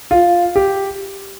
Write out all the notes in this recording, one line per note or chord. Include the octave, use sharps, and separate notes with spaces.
F4
G4